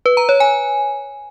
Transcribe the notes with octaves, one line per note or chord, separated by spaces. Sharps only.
B4
A#5
C#5
G#5